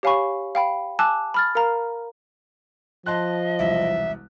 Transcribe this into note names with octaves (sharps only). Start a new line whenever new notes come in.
G4 C#5 F5 G#5 B5 C#6
F5 G5 B5
G#5 A5 D6 E6 F#6
B5 F6 A6
A#4 F5 A#5
F3 D#5 A5 C6 F#6
E1 C2 E5